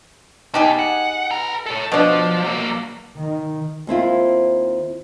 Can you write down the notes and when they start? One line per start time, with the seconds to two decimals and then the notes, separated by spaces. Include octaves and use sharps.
0.54 B2 D#4 G4 G#4
0.79 F#5
1.31 B4 A#5
1.66 A4 C#5
1.92 B2 F3 D4
2.44 F#3 A#3
3.16 D#3
3.87 D#2 C4 E4 F4